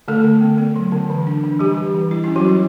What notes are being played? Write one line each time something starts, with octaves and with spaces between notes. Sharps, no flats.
D3 A3 A4
D3
B3
B3
F#3
D3
E3
D4
E3
E3 G3 G4
E3
E3
G3 E4
C#4 E4
F#3 F#4
G3 E4